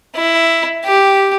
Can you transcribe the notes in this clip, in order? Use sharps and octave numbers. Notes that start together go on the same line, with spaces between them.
E4
G4